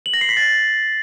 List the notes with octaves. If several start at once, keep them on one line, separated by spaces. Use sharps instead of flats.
F#7
A#6
C7
B6
A6